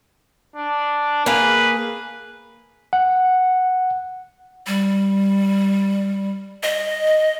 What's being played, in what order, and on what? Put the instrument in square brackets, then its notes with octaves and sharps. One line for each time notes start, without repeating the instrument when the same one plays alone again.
[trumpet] D4
[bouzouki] A#3 G#4 F5 [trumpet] B4
[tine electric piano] F#5
[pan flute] G3
D#5